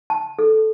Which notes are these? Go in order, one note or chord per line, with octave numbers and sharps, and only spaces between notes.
A5
A4